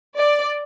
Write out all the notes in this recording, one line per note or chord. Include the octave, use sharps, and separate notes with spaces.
D5